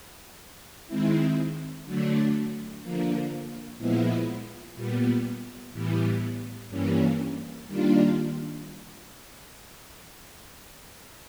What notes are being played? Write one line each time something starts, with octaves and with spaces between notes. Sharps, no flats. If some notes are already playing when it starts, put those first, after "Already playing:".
D#3 G#3 C4 E4
D3 F#3 A3 D4
D3 F3 A#3
A#2 F3 G#3 B3 E4
A#2 G3 B3
A2 E3 G3 B3
G2 E3 G3 A#3 C#4
D#3 G3 A#3 D4 F4